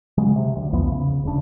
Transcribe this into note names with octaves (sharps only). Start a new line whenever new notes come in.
C#3 F#3 G#3
C3
D2
B1 E2 F3 B3
C#3
D#1 C#3 D4